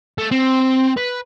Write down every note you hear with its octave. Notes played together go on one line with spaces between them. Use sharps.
A3
C4
B4